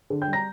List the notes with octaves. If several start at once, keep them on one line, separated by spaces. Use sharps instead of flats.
D3
G5 G6
G3
A#5 A#6